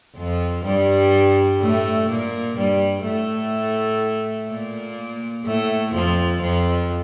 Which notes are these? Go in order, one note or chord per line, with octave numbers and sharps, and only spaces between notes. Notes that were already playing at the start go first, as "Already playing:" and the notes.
F2 F3
G2 G3
A2 A3
A#2 A#3
G2 G3
A2 A3
A#2 A#3
A2 A3
F2 F3
F2 F3